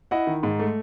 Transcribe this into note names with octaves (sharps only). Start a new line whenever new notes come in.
E4 D#5 F#5
D#3
G#2
A3